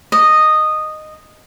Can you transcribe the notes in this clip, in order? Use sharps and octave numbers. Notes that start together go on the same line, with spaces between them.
D#5